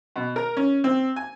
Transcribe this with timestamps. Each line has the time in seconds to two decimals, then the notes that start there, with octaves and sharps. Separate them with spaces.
0.16 B2
0.36 A#4
0.57 C#4
0.84 C4
1.16 G#5